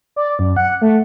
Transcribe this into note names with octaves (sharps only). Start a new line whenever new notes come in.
D5
F#2
F#5
A3